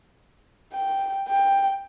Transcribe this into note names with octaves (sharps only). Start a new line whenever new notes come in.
G5
G5